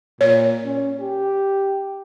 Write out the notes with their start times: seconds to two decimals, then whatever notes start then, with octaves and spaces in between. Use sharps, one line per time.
0.21 A#2 C#5
0.64 C#4
1.01 G4